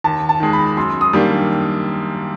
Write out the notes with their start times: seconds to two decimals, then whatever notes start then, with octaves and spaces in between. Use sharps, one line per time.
0.04 D#2 A5
0.29 A5
0.40 D#3 G#3
0.53 B5
0.77 F#2 C6
1.01 D#6
1.13 D#3 G3 A#3 D4